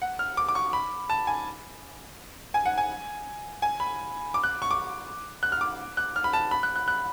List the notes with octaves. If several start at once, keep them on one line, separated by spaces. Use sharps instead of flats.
F#5
F6
D6
D6
C#6
B5
A5
G#5
G#5
F#5
G#5
G#5
B5
D6
F#6
C#6
D6
F#6
F6
D6
F#6
F6
B5
A5
B5
F#6
F#6
F#6